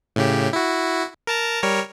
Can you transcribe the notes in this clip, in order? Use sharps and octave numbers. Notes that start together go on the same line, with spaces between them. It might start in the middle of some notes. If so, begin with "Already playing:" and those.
A2 C#3 G4
E4 F#4
A#4 A5 A#5
G3 A#4 C#5